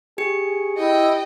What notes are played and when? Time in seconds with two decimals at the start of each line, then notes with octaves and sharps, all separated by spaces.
0.18 G4 G#4 C#7
0.78 E4 D#5 G5